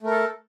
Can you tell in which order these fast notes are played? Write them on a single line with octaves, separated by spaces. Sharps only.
A3 A#4 A4